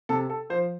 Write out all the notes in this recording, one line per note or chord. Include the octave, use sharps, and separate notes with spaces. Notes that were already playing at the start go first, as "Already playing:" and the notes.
C3 A4
A4
F3 C5